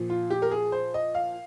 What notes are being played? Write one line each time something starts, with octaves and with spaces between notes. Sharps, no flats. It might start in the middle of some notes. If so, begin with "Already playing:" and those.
Already playing: A#2 F3
F4
G4
A#4
G#4
C5
D#5
F5